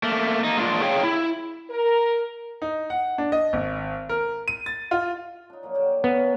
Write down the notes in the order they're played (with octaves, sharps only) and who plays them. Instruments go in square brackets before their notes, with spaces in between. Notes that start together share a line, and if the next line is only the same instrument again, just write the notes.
[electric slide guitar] A3 A#3
A#3 D#4
G#3 A#3 D4 F4
G#4 C#5 F5 G5
E4
[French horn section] A#4
[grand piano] D#4
F#5
D4
D#5
G#1
A#4
D#7
A6
F4
[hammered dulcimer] D4 D#4
F3 F#3 A#3
D3 A#3 G4
[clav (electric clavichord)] B3 [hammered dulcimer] C#4 F4
[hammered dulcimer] A#3 A#4